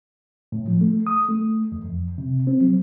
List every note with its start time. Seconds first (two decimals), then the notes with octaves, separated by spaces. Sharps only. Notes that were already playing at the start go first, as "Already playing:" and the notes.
0.52 A2
0.68 F3
0.81 A3
1.07 D#6
1.29 A3
1.72 E2
1.85 F2
2.18 C3
2.47 C4
2.61 F#3